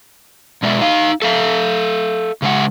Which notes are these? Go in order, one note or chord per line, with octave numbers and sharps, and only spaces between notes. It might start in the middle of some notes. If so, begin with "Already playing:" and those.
B2 G#3 D5 E5
D#4 F5
A4 E5 F5
C#3 G#3 F#5